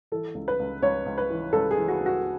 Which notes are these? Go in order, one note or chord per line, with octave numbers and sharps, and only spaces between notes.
E3 A4
C#2
B4
C#2
C#2 C#5
C#2
B4
E3
C#2 A4
G#4
E3
F#4
C#2
F#4